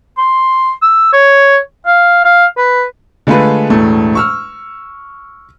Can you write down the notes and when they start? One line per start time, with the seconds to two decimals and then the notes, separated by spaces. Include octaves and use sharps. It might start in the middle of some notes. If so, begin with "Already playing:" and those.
0.18 C6
0.82 E6
1.13 C#5
1.87 F5
2.25 F5
2.57 B4
3.27 D3 G#3 A3 F4 B4
3.70 E1 A2 A3
4.15 C#6 E6 F6